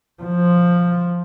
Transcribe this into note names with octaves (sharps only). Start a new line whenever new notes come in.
F3